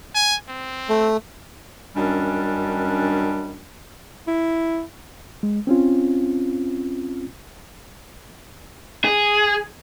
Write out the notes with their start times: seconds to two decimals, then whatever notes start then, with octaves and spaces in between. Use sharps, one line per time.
0.15 G#5
0.49 C4
0.89 A3
1.96 F#2 D#3 G3 C#4 D4
4.27 E4
5.43 G#3
5.67 C4 C#4 F4
9.05 G#4